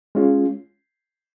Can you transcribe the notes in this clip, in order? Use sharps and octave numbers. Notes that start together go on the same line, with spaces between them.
G#3 C#4 F4